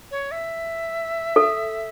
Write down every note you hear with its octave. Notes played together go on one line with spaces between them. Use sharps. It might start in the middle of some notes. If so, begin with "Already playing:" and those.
C#5
E5
A4